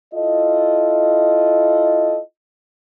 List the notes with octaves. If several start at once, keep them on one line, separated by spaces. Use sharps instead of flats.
E4 F4 A4 D#5